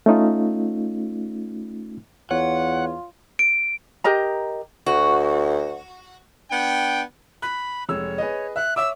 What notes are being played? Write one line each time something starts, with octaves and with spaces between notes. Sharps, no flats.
A3 C#4 D#4 F4
E2 F4 C#5 F#5
D7
G4 A#4 D#5 A#5
D2 F#4
B3 D4 G5
B5 F#6
F1 G#3 C#5 E6
G#4 B4 D#5
E5 F#6
C#5 E5 D6 E6